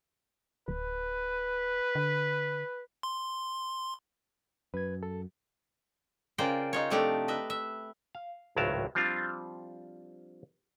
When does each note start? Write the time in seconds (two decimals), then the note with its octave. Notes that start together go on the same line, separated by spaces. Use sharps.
0.68 D1 B4
1.95 D3
3.03 C6
4.74 F#2 B4 G#6
5.03 A4
6.38 C#3 F4 A#4 C5 D5 G5
6.73 D#4 F4 C#5
6.90 C3 F3 A3 D4 D#4 G4
7.28 B4 D#5 E5
7.50 E5
8.15 F5
8.56 G#1 C#2 A2 F#3 A#4 A5
8.95 F3 G3 C4 D4 F4